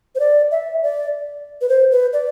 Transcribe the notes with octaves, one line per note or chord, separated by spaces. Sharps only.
C5
D5
E5
D5
B4
C5
B4
D5